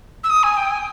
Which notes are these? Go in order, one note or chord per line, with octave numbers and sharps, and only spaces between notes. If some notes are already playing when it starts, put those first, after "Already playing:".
E6
D#6
G#5
G5
G#5